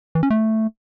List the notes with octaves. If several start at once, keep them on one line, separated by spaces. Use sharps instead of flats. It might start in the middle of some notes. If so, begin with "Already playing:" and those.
E3
C#4
A3